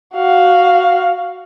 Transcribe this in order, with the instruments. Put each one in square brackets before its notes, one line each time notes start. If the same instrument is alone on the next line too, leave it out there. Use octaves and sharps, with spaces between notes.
[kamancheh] F#4 F5